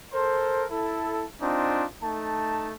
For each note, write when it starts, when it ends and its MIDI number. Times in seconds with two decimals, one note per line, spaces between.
0.13 0.65 69
0.13 0.65 70
0.13 0.65 72
0.70 1.24 64
0.70 1.24 69
1.41 1.84 60
1.41 1.84 62
1.41 1.84 63
1.41 1.84 65
2.02 2.74 57
2.02 2.74 63
2.02 2.74 81